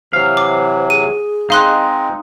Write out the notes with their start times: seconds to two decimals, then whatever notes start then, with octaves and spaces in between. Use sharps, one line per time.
0.13 C3 E3 F#3 C5 F5
0.37 D6
0.90 G#4 D#7
1.50 G#3 C4 D#4 F5 C6 F#6